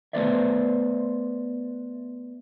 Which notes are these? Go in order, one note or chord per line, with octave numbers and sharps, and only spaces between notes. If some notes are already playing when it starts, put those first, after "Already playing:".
A3 B3 B4 C5 D5 E5